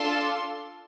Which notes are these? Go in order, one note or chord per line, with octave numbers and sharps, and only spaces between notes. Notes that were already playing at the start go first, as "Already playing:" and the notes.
Already playing: D4 F4 A4 C6